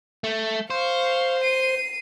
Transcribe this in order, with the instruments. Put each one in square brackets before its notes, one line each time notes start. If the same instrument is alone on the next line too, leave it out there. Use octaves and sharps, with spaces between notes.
[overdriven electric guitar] A3
[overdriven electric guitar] C5 [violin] F5 C#6
[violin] C7 D#7